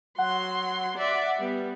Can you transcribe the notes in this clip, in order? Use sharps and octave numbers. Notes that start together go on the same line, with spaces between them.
F#3 F#5 C6
D5 E5
G3 B3